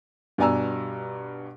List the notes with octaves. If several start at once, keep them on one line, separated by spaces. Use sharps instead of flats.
G2 B2 D5 G#5 A#5 E6